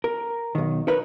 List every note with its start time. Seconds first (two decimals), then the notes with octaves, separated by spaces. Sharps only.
0.04 A#4
0.55 B1 D#3
0.87 D#4 A#4 B4 C#5